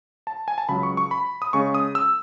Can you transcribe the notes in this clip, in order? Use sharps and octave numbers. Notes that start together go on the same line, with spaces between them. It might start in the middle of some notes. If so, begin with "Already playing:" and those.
A5
G#5
A5
C#2 C#3 F#3 B5
C#6
C#6
B5
D#6
C#3 G#3 C#4 C#6
D#6
E6